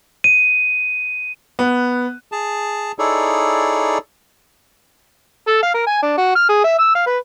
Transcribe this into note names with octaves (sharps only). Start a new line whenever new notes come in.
D#7
B3
G#4 A5
D#4 E4 G#4 A4 C#5 D5
A4
F5
A#4
G#5
D4
F#4
F6
G#4
E5
E6
F5
B4